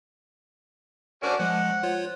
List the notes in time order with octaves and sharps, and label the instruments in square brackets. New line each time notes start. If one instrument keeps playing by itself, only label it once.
[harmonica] C#4 D4 F#4 [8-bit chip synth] A#4 C5
[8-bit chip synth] F3 G#3 [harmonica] F#5
[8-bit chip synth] F4 C5 C#5